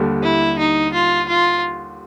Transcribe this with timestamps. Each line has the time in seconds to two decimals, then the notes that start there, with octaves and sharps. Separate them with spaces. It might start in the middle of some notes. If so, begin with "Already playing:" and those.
Already playing: D#2 D3 G3
0.23 E4
0.59 D#4
0.93 F4
1.28 F4